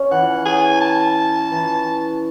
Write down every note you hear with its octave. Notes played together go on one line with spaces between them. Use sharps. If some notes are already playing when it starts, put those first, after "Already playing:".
Already playing: C#4
E3 F#5
G#5
A5
E3